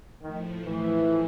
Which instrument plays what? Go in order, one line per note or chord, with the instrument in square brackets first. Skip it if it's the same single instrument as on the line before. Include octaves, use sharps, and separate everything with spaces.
[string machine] A2 F3 A3 [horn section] D#3
[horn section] E3